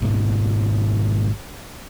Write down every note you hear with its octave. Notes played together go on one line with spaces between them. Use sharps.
G#1 G#2 B2